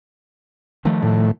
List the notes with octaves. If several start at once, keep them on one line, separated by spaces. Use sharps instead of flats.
D#3 F3 A3
A2